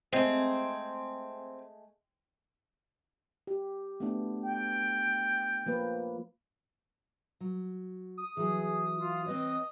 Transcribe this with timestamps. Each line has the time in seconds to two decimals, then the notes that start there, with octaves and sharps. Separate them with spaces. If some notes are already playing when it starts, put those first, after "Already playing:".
0.13 G#3 A3 C4 G#4
3.47 G4
4.00 A3 B3 D4
4.44 G5
5.66 F3 A#3 B4
7.40 F#3
8.18 D#6
8.37 E3 F#3 G#4
8.98 F4
9.26 C4 B4 C#5 D#5